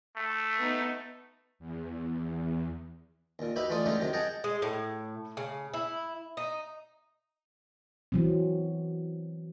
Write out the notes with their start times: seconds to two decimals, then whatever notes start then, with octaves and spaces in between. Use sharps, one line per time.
0.16 A3
0.59 B3 D#4
1.59 E2
3.39 D#2 A#2
3.56 D#4 F#4 G4 B4 E5 B5
3.70 E3 A3 F4 D5 D#6
3.86 D3 G#3 A3 C#4 D#4 G4
3.99 C3 D#3 F#3 G4
4.13 G#4 D#5 F#5 G5 A5 A#5
4.44 G#3
4.62 A2
5.37 C#3
5.74 E4
6.37 D#4
8.12 E3 F#3 C4